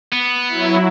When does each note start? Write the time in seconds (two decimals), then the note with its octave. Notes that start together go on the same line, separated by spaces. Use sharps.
0.13 B3
0.48 F#3 E4